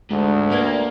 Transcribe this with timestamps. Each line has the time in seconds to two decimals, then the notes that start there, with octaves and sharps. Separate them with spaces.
0.10 D2 G#2
0.51 A#3 B4 D5 G#6